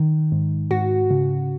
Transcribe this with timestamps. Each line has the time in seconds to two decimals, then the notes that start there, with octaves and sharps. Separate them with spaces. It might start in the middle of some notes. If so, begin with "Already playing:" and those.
Already playing: D#3
0.32 G#2
0.71 G#2 F#4
1.11 C#3